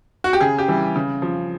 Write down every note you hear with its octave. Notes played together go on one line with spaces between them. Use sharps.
F#4
G4
C#3 G#4
G4
E3 G3
C#3
F3